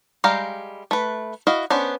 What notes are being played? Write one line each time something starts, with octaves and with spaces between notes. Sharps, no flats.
G3 G#3 F5 G5 A#5
A3 B4
E4 F#4 D#5 F5
B3 C#4 D4 C5